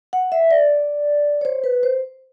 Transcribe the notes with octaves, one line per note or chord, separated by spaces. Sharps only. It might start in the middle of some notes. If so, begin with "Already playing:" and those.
F#5
E5
D5
C#5
C5
B4
C5